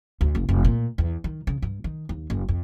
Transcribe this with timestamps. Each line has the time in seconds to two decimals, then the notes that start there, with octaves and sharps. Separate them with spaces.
0.21 D2
0.35 F#1
0.49 F1
0.64 A#2
0.98 E2
1.24 D#3
1.47 C#3
1.62 G2
1.84 D#3
2.09 D#2
2.30 F#1
2.49 F2